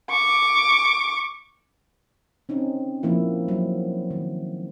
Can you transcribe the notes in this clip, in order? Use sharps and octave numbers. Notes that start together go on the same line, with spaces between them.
C#6 D6
C4 C#4 D#4
F3 A#3 E4
F#3
D#3